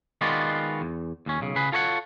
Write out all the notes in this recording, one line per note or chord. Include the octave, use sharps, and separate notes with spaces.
D#3 G#3 B3 F4 F#4 D5
E2
D#2 C#4
B1 C#3
C#3 G#4 B4
F4 A4 C#5 D#5 F#5